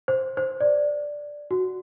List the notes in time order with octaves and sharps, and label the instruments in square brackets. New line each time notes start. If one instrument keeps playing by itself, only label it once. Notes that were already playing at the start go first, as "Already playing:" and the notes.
[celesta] C5
C5
D5
F#4